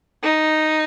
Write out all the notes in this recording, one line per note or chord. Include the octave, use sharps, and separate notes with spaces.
D#4